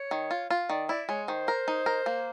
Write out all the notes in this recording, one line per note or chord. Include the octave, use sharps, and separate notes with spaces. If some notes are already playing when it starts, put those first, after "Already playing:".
Already playing: C#5
D#3
F4
F4
D#3 D5
E4 D5
G#3 C#5
D#3 C5
A#4
D#4
A#4
A#3